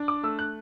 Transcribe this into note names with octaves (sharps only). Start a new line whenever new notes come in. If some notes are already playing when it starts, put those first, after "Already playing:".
Already playing: D4
D6
A3 E6
F#6